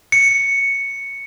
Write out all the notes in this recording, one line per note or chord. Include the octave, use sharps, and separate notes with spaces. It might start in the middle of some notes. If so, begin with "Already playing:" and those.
C#7